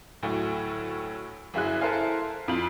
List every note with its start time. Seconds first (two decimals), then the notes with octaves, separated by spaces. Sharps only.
0.23 D2 A2 F#3 A3
1.54 G1 F#2 E4 G#4 F#6
1.81 E4 A4 A#4 C5 F5 G#5
2.48 F2 F4 F#7